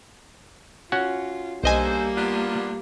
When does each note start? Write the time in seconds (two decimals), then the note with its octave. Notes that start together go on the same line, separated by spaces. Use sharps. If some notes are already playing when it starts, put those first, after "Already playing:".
0.92 C#4 F4 F#4 F#5
1.64 B1 G3 A#3 D4 A4 C5 D#5 G#5
2.15 B3 D4 F4